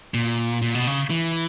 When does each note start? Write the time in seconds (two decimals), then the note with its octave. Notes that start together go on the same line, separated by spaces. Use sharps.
0.14 A#2
0.62 A#2
0.75 B2
0.87 C#3
1.10 E3